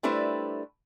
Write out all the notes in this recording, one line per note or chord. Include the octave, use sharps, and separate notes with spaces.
G3 A3 D4 E4 B4 C5